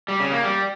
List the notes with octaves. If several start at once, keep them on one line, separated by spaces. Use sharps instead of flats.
G3
C#3
A#3
G3